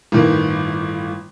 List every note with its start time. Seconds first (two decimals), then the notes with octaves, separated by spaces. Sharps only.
0.12 G1 A2 D#3 A#3